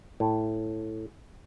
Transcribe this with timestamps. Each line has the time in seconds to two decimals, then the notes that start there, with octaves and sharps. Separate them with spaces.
0.20 A2